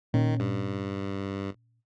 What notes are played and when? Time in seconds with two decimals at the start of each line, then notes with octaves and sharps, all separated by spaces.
0.14 A#2 D#3 C#4
0.40 G2